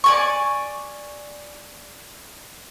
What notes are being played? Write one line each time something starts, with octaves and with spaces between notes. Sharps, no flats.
D5 G#5 C#6